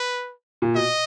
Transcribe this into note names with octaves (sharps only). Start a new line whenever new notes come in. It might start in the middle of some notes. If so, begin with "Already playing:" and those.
Already playing: B4
A#2
B2 D#5